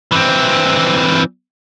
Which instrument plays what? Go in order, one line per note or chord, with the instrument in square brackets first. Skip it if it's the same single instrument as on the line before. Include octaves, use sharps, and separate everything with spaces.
[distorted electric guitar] E3 C4